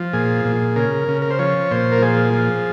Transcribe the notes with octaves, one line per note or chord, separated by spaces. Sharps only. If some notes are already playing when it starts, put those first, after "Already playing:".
Already playing: F3
A#2 G#4
A#2
C#3 A#4
C#3
A#4
C5
F3 C#5
A#2 C5
A#4
F3 G#4
F3